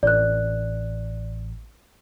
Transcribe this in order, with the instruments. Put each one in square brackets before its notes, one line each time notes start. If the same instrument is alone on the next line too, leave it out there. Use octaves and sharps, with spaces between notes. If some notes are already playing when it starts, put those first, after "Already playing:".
[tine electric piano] A1 [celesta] D5 F#6